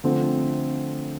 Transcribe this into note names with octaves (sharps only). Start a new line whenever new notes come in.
D3 F3 A3 C4